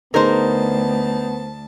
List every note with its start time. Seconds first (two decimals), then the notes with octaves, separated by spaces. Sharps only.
0.14 D2 B3 D#4 G#4 A#4 C5 A5